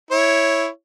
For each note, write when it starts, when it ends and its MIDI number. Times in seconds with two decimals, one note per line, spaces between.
0.11 0.68 64
0.11 0.68 73